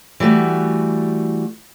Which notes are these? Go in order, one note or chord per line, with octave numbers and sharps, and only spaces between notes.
E3 G3 A3 F#4